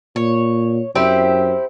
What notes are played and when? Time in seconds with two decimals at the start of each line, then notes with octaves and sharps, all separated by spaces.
0.16 A#2 C#5
0.95 F#2 C4 E4 G4